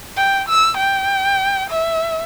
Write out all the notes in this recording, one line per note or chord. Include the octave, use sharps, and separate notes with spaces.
G5
E6
G5
E5